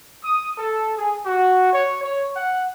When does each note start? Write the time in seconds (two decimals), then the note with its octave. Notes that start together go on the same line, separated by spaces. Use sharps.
0.24 D#6
0.58 A4
0.97 G#4
1.26 F#4
1.73 C#5
2.04 C#5
2.36 F#5